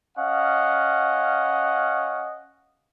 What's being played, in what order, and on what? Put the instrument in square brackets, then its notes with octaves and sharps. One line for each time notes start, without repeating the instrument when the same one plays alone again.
[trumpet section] C#4 D#5 F5 F#5